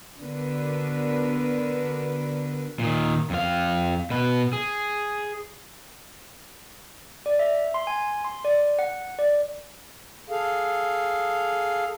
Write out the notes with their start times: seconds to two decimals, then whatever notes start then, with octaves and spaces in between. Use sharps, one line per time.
0.19 D3 B3 D4 F#4 A#4 B4
2.79 A#2 D#3
3.30 F2 F5
4.10 B2 B4
4.53 G#4
7.26 D5
7.39 E5
7.74 C6
7.87 G#5
8.25 C6
8.45 D5
8.79 F#5
9.19 D5
10.30 G#4 A4 F5